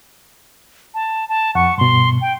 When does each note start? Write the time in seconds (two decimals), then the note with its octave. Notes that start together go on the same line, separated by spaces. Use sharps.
0.94 A5
1.29 A5
1.55 F2 F#5 C#6
1.78 G2 B2 C6
2.21 G5